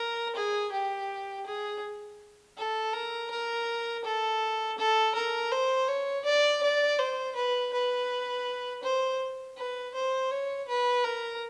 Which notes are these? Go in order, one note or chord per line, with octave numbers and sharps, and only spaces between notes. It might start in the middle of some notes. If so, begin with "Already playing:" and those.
Already playing: A#4
G#4
G4
G#4
A4
A#4
A#4
A4
A4
A#4
C5
C#5
D5
D5
C5
B4
B4
C5
B4
C5
C#5
B4
A#4